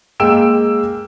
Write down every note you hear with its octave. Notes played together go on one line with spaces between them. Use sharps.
G#3 A#3 G5 E6 D7 E7